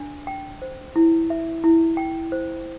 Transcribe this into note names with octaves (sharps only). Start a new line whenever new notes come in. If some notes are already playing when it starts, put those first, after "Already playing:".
Already playing: D4
G5
C5
E4
E5
E4
G5
C5